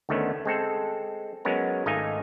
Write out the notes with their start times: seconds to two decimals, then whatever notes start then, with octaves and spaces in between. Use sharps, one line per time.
0.09 D2 D#3 A3 B3 C#4
0.45 G#3 C4 A4
1.45 F#3 G#3 B3 C#4 A#4
1.86 G#1 A3 D#4 D#5 F5 G#5